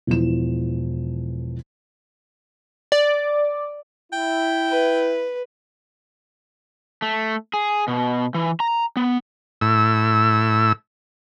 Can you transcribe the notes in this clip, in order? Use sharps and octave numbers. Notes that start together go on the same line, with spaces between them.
E1 E2 E3 F3 E7
D5
E4 G5
B4
A3
G#4
B2
E3
A#5
B3
A2 E6